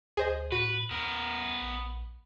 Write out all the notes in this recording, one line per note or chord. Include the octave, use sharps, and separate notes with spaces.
D2 G#4 C5 D#5
A2 F#4 B4
D#2 B3 A#4
A#1